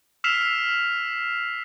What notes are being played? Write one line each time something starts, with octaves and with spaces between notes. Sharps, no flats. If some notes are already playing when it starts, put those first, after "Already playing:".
E6 F6 B6 C7 E7 F7